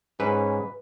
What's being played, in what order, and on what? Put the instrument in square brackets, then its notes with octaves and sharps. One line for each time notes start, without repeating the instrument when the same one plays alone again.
[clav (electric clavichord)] G#2 [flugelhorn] C#4 [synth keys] B4